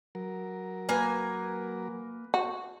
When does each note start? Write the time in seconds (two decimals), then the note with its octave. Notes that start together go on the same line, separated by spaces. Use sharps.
0.15 F#3 A#4
0.89 A#3 B4 G#5
2.34 F#4